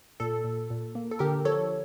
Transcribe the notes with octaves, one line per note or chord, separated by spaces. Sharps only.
A#2 A4
A#2
A#2
A#3
A4
D3 G4 A#4
F3 A4 C#5